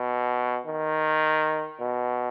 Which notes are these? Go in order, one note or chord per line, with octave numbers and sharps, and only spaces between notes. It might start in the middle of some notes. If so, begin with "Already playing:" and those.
Already playing: B2
D#3
B2